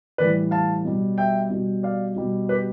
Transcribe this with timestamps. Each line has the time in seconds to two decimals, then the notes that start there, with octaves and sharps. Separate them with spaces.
0.18 A2 E3 G3 B4 D5
0.51 F5 A5
0.85 B2 G3
1.18 E5 G5
1.50 B2 G3
1.83 D5 F5
2.16 B2 G3
2.49 G4 B4